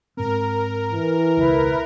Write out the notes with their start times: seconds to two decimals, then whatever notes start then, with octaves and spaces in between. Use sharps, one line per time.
0.17 G#2 C4 A#4
0.92 E3
1.37 E1 C#2 E4 B4 E5